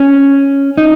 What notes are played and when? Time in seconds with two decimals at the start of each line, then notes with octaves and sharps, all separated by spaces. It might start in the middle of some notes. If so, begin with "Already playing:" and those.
Already playing: C#4
0.78 D#4